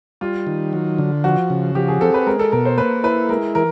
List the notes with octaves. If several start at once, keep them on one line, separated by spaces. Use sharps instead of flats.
G3 F4
D#3
F#3
D3
F3 F#4
C#3
F3 G4
G#4
C4 A4
B4
G#3 A#4
A4
B2 A#4
C5
A#3 B4
E4 B4
G#3 A#4
E3 A#4